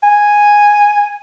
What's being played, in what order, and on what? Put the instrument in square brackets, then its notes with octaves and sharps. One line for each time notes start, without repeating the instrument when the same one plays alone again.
[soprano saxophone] G#5